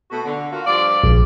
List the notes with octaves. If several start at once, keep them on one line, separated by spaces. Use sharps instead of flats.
B2 A3 F#4
D3
A#3 F4 F#4
G2 F3 D5
A#1